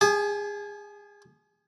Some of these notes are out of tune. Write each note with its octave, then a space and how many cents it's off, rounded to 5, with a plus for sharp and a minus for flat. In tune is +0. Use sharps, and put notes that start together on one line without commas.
G#4 -25 G#5 +40